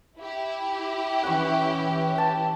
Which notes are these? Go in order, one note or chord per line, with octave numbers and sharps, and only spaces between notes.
E4 G4
E3 C#4 F#5 B5 C#6
G5 A5